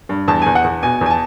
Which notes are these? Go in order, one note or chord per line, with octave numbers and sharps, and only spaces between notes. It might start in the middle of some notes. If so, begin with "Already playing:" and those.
G2
E2 A5
E2 G#5
F#5
E2
B2 G#5
E2 G#5
A5